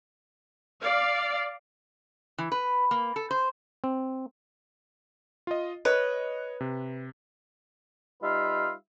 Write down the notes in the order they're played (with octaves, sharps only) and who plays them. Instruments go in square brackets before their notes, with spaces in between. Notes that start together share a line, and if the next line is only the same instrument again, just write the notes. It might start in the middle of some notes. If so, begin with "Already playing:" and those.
[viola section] D5 F5
[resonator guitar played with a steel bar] E3
B4
A#3
A4
C5
[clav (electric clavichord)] C4
[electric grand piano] F4 D#5
[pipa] B4 [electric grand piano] C#5 D#5
[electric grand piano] C3
[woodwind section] G3 D#4 F4 B4 E5 F5